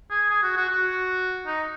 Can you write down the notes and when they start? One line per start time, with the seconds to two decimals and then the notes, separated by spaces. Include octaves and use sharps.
0.11 G#4
0.30 G#4
0.43 F#4
0.56 F#4
0.69 F#4
1.46 D#4